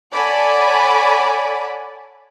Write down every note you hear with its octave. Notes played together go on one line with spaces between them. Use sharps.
A4 C#5 D5 F#5 G#5 B5